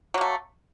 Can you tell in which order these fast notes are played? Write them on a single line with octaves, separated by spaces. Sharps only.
F#3 A#3 A3